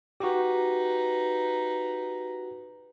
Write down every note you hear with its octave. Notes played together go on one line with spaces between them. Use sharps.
D#4 F#4 G4 B4